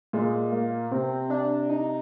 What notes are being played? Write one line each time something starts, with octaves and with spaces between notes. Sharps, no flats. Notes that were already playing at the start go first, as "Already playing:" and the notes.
A#2 G#3
A#3
C3 C4
D4
D#4